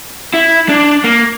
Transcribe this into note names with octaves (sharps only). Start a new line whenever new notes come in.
E4
D4
A#3